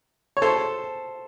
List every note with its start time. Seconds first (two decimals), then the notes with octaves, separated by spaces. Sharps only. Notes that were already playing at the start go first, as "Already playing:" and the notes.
0.37 C#5
0.42 A4 C5